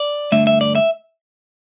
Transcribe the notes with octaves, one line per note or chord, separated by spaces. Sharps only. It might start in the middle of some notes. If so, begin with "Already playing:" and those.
Already playing: D5
G2 D3 A3 E5
E5
D5
E5